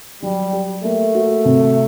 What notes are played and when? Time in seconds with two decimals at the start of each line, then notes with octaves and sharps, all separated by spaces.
0.22 F#3 G3
0.53 G4
0.84 A3 A#3
1.15 F#4
1.45 C3